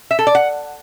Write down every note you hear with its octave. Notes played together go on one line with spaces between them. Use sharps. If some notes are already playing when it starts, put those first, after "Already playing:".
E5
A4
D5
F#5